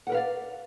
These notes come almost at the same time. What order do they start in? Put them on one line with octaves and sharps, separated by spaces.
F#5 A#4 B4 F5 D5